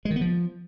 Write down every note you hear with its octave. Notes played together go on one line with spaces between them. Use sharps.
G#3
D#3
B3
F3